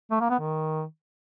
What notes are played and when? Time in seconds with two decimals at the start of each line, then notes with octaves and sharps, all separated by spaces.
0.11 A3
0.21 A#3
0.30 B3
0.40 D#3